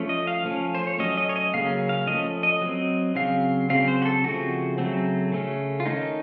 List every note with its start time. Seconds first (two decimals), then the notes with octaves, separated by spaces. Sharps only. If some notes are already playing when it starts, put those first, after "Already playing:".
Already playing: F3 A3 C#4
0.09 D#5
0.27 F5
0.45 F3 A3 C#4
0.75 C5
0.87 C#5
0.99 F#3 A3 C#4 D#5
1.17 D#5
1.29 C#5
1.36 D#5
1.54 C#3 F#3 A#3 C#4 F5
1.89 F5
2.07 F3 A3 C#4 D#5
2.43 D#5
2.62 F#3 C4
3.15 C#3 F#3 C4 F5
3.69 C#3 F#3 C4 F5
3.88 C5
4.02 F#4
4.05 A4
4.24 C#3 F3 A3 C4 F#4
4.78 C#3 F#3 A3 C4
5.32 C#3 A3 C#4
5.80 F4
5.86 D#3 A3 C#4 D#4